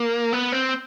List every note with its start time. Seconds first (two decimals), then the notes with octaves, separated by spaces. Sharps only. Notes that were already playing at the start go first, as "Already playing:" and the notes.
Already playing: A#3
0.33 B3
0.52 C4